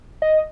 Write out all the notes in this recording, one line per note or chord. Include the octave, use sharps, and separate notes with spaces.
D#5